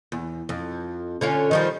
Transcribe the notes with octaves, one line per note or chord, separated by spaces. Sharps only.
E2
F2
D3 C#4 F4
D#3 F3 G3